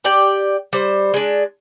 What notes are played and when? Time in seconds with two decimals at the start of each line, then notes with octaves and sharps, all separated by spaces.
0.04 G4 D5 G5
0.73 G3 C5
1.14 G#3 D4